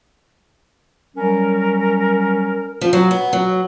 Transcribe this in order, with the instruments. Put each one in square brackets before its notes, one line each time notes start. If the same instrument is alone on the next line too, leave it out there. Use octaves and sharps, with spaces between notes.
[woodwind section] F#3 G3 C#4 A#4
[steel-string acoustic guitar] F3
F#3
B3
F#3